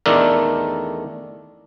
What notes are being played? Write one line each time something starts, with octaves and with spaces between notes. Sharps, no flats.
E2 D#3 A3 D4 A4 A#4